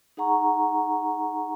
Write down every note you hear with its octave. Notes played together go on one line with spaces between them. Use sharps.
D#4 G#4 F#5 A#5 C#6